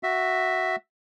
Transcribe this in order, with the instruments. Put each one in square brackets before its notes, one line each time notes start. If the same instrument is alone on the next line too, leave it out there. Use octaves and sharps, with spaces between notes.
[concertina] F#4 E5